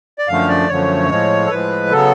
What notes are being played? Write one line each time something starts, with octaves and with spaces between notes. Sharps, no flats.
D5
F#2 D3 F3 A3 F5
D5
F#2 D3 F3 A3 C#5
A2 F3 G#3
A4
A2 F3 G#3 B4
C#3 F#3 B3 A4